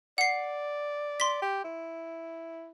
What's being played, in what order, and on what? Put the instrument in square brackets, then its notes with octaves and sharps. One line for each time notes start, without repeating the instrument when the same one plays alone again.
[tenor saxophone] D5 [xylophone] F#5 C7
[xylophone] C6 B6
[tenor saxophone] G4
E4